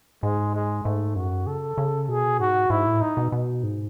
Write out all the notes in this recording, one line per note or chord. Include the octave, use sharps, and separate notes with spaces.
G#2 G#3
G#3
G#2 A3
F#2 F#4
C#3 A4
C#3
B2 G#4
G#2 F#4
G#2 E4
A2
D#4
B2
B2
G#2